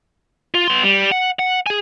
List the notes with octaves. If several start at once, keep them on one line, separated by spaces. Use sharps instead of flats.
F4
B3 C6
G3
F#5
F#5
G#4 G#5